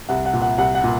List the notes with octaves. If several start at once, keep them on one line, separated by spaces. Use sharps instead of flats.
C2 F#5
F#5
A#2
F#5
C2 F#5
F#5
A#2